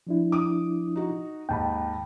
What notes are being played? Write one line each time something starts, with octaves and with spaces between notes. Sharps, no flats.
F3 D4 E4
D6 D#6
D#4 F#4
D#2 G#2 G5 A5 B5